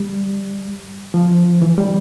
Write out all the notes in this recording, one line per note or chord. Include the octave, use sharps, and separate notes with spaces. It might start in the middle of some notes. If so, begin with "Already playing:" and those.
Already playing: G3
F3
E3
G3